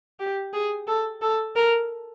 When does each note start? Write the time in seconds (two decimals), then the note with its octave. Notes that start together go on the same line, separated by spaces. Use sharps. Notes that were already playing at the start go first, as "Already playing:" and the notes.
0.20 G4
0.53 G#4
0.88 A4
1.22 A4
1.56 A#4